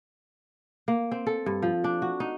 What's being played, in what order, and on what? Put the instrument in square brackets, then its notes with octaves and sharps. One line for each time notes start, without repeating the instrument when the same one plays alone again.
[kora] A#3
C4
A4
G2
F3
D4
F#4
D#4